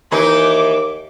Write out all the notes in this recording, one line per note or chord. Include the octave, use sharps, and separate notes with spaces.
D#2 E3 D#4 D6